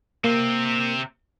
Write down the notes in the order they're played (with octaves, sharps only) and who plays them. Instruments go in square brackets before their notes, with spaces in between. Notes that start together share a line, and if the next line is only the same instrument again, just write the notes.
[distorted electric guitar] C3 C4 [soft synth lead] A#3